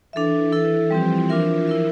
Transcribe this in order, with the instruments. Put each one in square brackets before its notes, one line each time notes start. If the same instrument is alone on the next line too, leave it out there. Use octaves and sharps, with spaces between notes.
[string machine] E3 [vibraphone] D4 A4 E5
[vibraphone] E4 A4 E5
[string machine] F3 [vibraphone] G3 C4 G4
[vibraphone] D4 F4 A#4 E5
E4 A#4 E5